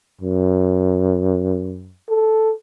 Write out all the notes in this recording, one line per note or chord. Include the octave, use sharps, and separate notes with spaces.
F#2
A4